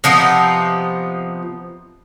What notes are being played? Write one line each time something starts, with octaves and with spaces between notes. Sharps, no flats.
C3 F3 B3 D#4